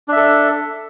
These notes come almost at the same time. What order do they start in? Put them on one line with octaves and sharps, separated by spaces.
D4 E5 A4